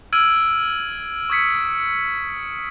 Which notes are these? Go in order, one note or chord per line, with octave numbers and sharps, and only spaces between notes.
E6 F6 G#6 D7 D#7 F#7
C#6 D#6 G#6 B6 C#7